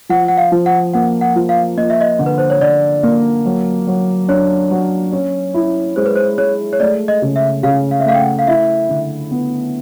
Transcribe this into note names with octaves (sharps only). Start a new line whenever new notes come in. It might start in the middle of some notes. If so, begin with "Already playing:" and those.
F3 F#5
F#5
F5
F3
F#5
A#3 F#5
F#5
F3
F5
A#3 D#5
E5
D#5
D3
B4
C5
C#5
D3 D5
A#3
F#3
F#3
D4 C#5
F#3
C#4
E4
G#3 C5
B4
C5
G#3 C#5
C#5
A3 D5
D#5
C#3
E5
C#3 F5
F5
E5
A3 F5
G5
F#5
F5
E4 E5
D3
B3